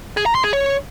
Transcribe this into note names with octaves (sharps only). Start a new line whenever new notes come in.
G#4
A#5
C6
G#4
C#5